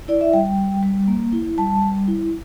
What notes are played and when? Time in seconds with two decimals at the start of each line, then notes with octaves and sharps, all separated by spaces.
0.08 E4 D5
0.21 E5
0.33 G3 G5
0.45 G5
0.58 G3
0.83 G3
1.08 A#3
1.33 E4
1.58 G3 A5
1.82 G3
2.07 E4